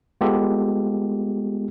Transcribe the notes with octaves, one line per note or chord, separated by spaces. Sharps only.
G#3 B3 F4 G4 A4